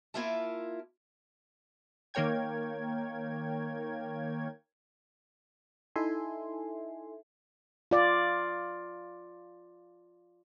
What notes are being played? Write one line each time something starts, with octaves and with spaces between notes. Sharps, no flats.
A#3 E4 F4 A#4 E5 A5
D#3 A#3 A#4 C#5 G5 G#6
D#4 E4 A4 E5 G#5 C6
F4 D5